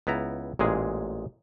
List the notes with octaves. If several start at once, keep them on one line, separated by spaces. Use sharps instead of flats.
C#2 B3 E4 A#5
A1 A#2 G#3 G#4